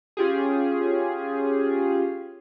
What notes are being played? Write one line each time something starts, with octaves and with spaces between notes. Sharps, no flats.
C#4 F4 G4 G#4